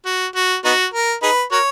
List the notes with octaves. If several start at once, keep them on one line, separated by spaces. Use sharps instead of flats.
F#4
F#4
B3 D#4 F#4
A#4
D#4 G#4 B4
F#4 A#4 C#5